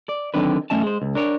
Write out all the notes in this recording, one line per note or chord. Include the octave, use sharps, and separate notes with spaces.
D5
D3 D#3 F#3 C4 D4 B4
F#2 A3 C#4 D#5 A5
G#3 C5
C#2
D4 A#4 C#5